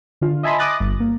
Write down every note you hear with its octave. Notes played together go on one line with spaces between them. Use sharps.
D3 F4
D#5 E5 G#5 A5 B5 C6
E5 D6 D#6 F#6 A6 A#6
G1
A#3